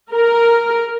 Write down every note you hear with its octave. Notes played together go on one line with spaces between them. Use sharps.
A#4